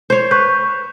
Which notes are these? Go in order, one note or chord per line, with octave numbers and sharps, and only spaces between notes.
C5 C#5
B4 C#6 G6